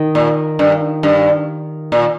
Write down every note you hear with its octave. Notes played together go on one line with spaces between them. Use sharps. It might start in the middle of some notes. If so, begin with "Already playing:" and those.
Already playing: D#3 D#4
A#2
G2
G2
A#2